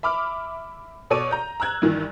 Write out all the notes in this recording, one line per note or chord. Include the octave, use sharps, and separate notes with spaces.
E5 B5 D6 F6
B2 A4 C#5 D5 C#6 D#7
A#5 G6
A#5 E6 F#6 G#6
G2 D#3 E3